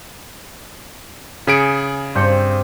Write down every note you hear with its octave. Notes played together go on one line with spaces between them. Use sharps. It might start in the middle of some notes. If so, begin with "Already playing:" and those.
C#3 G#4 B6 C#7 D7
G2 C4 D5 G5 G6 C#7